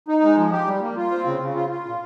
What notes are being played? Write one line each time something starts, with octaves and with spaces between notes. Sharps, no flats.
D#4
G#3
F3
G4
G3
A#3
F4
C4
C#3
C#3
F4
F4
A#2